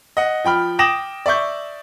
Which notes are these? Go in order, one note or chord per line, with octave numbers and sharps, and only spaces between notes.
D#5 F#5
F3 G5 B5 F6
G5 D6 D#6 A#6 E7 F#7
D5 E5 C#6 G6